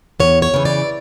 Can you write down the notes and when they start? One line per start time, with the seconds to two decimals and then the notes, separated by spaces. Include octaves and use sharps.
0.20 E2 C#5
0.42 C#5
0.54 C#3 E3
0.65 D5